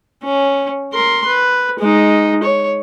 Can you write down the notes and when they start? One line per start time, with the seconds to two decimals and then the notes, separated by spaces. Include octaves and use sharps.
0.24 C#4
0.93 A#4 C6
1.26 B4
1.80 G#3 D#4
2.43 C#5